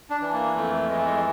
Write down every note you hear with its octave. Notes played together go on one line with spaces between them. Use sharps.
D4
E3
A#3
F2 A3
E3 G#3
A3
G#3